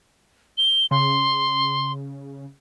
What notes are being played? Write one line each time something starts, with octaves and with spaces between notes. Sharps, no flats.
G7
C#3 C6